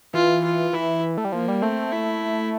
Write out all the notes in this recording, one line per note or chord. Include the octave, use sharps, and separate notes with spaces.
E3 F4
F4
E3 E4
A3
G3
F3 A#3
G3
A3 C4
E4